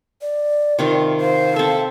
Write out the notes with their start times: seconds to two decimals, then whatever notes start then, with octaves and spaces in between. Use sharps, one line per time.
0.22 D5
0.79 C3 D#3 F4
1.20 C5 F5
1.56 C4 A4 E5